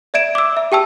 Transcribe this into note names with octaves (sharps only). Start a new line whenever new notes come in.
D5 E5 G#6 D7 E7
D6 E6
E5
G4 G5 A5 E6